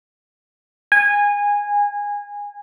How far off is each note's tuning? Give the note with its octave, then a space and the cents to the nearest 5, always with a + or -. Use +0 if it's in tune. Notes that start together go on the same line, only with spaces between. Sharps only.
G#5 -20